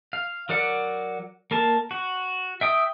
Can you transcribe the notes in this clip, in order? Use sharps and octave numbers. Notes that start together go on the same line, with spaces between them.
F5
F#3 A#4 D5 F#5
A#3 A#4 A5
F#4
E5 G5 D#6